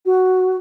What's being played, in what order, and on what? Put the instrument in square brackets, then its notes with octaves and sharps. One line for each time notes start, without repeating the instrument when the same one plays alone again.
[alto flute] F#4